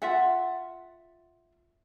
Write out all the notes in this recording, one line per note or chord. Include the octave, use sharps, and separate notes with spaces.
F4 E5 F#5